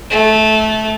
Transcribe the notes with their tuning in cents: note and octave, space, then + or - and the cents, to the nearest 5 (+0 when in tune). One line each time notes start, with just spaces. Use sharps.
A3 -15